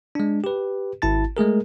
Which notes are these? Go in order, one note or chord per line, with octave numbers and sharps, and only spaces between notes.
G#3 D4
G4 B4
G#1 E4 A5 A6
G#3 A3 G#4 A#4